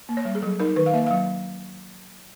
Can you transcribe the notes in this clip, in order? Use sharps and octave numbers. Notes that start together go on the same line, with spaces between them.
A#3
C#5
G3
G#4
F#3 A4
D#4 A#4
D#3 B4
F5
A#3 E5
F#3 F5